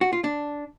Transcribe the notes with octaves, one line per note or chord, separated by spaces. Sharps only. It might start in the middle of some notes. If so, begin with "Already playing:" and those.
F#4
F4
D4